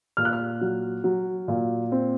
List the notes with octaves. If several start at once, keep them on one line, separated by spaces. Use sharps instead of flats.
A#2 F6
F#6
F6
F#3
F#3
A#2
C4